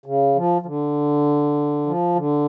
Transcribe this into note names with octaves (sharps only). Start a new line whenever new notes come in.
C#3
F3
F3
D3
F3
D3